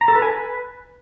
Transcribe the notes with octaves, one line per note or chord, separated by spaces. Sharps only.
A#5
A4
B4
G#5
B4